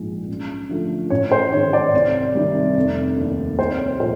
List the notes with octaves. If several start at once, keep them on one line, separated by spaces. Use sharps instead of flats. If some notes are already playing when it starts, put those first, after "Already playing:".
Already playing: A#1 G#2 F3 G#3
F#2
D3 F3 A3
A1 C#5
C5
G#2 D#3 C#5
D5
C2
C3 D#3 G3
F1
D#2 D#3
C2 C5
C#5
A#2 F3 A3 C5